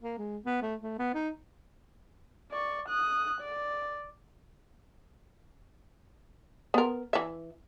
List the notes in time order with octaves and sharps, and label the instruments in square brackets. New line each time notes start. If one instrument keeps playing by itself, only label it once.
[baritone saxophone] A#3
G#3
B3
A3
A3
B3
D#4
[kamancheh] D5 C#6
D#6 F#6
D5
[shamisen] B3 A#4
E3 E5